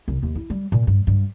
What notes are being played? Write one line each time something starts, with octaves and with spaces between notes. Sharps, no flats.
C2
D#2
E4
G3
A#2
G2
G2